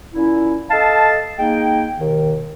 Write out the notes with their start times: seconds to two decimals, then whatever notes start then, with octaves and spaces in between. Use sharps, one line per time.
0.14 A#2 C#4 E4
0.71 A4 D#5 F5 A5
1.38 G#3 A#3 D#4 G5
1.99 D#2 B2 D#3